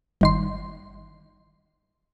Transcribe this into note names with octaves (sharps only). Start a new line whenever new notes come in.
G1 D#3 C6